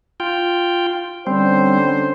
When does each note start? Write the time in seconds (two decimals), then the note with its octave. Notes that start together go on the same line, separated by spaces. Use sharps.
0.20 F4 G5
1.27 D3 G3 C4 C#4 C5